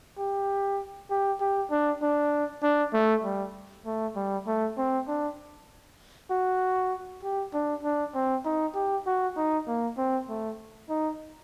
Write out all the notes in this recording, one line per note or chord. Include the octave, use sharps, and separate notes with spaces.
G4
G4
G4
D4
D4
D4
A3
G3
A3
G3
A3
C4
D4
F#4
G4
D4
D4
C4
D#4
G4
F#4
D#4
A#3
C4
A3
D#4